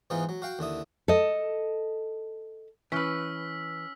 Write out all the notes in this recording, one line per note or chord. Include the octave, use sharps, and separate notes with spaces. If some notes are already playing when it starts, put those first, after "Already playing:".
G#2 E3 B3 D#4 F4
F#3
F#4 F5 G5
D#2 D3 E4 D#6
A4 D#5
E3 C#4 B4 E6 F6 B6